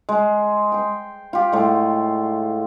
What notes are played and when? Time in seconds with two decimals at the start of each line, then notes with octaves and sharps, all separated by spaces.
0.09 G#3
0.72 G5 C6
1.33 F4 G4
1.52 A2 G#3